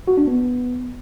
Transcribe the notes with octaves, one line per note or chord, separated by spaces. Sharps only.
F#4
D4
B3